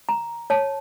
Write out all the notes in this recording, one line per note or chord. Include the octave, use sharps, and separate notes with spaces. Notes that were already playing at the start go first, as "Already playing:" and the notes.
A#5
C#5 A5